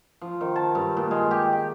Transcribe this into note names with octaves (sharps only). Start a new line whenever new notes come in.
F3
D#3
A5
G2
A#2
G#3
G4
G5